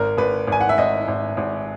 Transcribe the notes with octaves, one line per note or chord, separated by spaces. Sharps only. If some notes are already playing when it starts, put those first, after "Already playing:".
Already playing: G#1 A#4
G#1 B4
G#1 G#5
F#5
E5
G#1 D#5
G#1
G#1